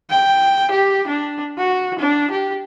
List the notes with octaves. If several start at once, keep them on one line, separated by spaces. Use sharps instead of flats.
G5
G4
D4
F#4
D4
G4